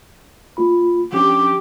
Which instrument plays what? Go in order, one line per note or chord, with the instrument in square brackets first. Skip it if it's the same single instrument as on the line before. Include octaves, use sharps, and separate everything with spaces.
[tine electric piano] A#3 F4 B5
[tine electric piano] F3 C#4 D4 [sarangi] G4